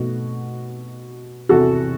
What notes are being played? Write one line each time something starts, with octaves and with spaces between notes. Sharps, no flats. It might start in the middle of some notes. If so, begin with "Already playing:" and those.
Already playing: B2 A3 D#4 F#4
E2 C3 E3 F#4 A4